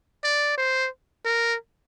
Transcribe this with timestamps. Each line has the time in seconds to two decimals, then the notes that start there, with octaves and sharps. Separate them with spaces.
0.24 D5
0.58 C5
1.25 A#4